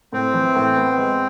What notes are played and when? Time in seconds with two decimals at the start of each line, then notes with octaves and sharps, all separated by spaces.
0.13 A2 C4
0.34 E3
0.55 A2
0.76 B3
0.98 G#3